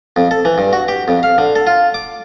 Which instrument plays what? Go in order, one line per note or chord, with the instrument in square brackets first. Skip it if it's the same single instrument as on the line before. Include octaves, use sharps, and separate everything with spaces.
[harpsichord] F2
A4
E3
G2
F#4
G4
F2
F5
D3
A4
F4
D6